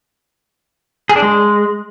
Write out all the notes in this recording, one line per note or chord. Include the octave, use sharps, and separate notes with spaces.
G#4
D4
G#3